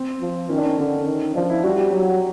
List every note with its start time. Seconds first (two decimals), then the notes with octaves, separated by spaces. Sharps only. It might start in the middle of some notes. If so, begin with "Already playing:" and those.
Already playing: C4
0.21 F3
0.49 D#3 C#4
0.58 D4
0.65 C#4
0.78 D3 C#4
1.07 D#3
1.35 F3 D4
1.50 E4
1.64 G3 F#4
1.79 G4
1.93 F#3